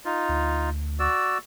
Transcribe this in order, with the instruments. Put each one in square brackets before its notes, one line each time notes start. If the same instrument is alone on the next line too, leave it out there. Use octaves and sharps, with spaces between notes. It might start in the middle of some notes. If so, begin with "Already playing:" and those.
[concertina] D#4 F4
[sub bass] D2
[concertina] F#4 D5 E6